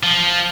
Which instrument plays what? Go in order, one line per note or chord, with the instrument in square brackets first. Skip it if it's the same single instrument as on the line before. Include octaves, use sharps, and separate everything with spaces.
[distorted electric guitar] F3